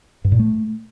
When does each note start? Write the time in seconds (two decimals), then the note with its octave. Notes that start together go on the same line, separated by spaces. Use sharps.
0.25 G2
0.32 A#2
0.39 A3